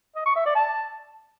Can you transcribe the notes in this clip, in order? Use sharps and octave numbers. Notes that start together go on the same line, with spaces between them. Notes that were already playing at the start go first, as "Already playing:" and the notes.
D#5
C#6
E5
D5
A5